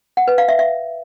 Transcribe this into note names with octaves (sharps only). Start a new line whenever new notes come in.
F#5
B4
F5
E5
E5